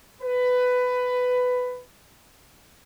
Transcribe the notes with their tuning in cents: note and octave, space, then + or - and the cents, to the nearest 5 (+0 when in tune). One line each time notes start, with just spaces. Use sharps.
B4 +15